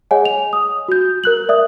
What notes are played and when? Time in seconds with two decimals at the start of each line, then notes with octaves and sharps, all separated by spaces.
0.11 G#4 C#5 D#5 F#5 G#5
0.25 F7
0.53 D#6
0.88 F#4 G6
1.24 A#4 F#6 F#7
1.49 D5 E5 D#6